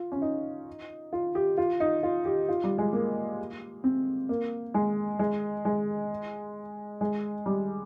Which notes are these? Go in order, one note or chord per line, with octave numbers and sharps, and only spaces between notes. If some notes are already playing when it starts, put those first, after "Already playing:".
Already playing: F4
C#4
D#4
F4
G4
F4
D#4
F4
G4
F4
G3
G#3
A#3
C4
A#3
G#3
G#3
G#3
G#3
G3